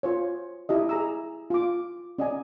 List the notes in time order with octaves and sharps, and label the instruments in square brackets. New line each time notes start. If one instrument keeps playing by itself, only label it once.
[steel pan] F4 C5 C#5
E4 G4 D#5
G#4 A#5 E6
F4 D6
C#4 D5 D#5 F#5 G#5